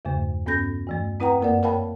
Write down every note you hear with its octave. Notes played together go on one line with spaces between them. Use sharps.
E2 G2 C#3 A3
G2 B3 C#4 A4 G6 A#6
G2 E3 A3
C4 E4 B4 F#5 G5 A#5
F#2 A#3 A#4 D5 F#5
A#4 C#5 F5 G5 A5 B5